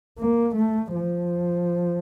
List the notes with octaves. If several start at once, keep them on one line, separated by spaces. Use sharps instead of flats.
A#3
A3
F3